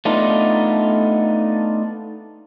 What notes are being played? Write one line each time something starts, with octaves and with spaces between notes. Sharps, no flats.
A3 B3 D4 D#4 F4